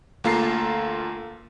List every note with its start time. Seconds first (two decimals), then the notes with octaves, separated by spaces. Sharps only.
0.24 D2 A#3 F4 A4 A#5 C7